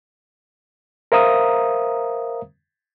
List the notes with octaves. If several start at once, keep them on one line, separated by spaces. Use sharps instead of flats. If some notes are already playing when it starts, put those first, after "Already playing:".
A#4 C5 E5 F5 A#5 D#6